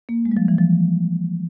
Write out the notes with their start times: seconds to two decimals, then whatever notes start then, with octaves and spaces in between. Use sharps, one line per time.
0.09 A#3
0.25 G#3
0.32 G3
0.37 F3
0.48 E3
0.59 F3